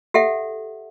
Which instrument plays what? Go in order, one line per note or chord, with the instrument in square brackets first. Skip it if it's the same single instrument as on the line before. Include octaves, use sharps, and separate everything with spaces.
[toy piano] G4 A4 E5 F#5